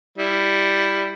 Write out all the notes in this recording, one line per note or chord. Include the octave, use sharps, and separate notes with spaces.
G3 E4